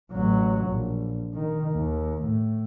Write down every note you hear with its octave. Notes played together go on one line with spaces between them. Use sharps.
A1 F#3
A#1
D#3
D#2
A2